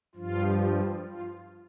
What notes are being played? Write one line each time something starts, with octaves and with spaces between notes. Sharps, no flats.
G2 F3 F4
F4